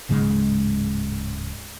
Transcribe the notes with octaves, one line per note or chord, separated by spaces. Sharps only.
D1 G#2 C#3 G#3